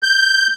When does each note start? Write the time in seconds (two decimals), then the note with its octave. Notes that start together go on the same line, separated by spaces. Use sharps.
0.03 G6